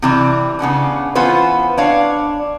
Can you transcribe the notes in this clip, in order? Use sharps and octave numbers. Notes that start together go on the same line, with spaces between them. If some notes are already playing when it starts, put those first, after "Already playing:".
C3 E3 G3
C#3 B3 C#4 D4
E3 B3 C#4 F4 B4 C5
D4 C#5 F5